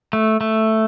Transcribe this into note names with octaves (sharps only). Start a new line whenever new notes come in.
A3
A3